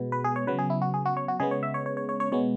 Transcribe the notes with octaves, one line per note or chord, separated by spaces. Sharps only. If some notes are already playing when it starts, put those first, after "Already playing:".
Already playing: B2 G#3 B3
B4
G#4
C#5
C#3 F#3 B3 B4
G#4
E4
F#4
G#4
F#4
C#5
F#4
C#3 G#3 B3 G#4
C#5
E5
C#5
C#5
C#5
C#5
C#5
B2 G#3 B3 C#5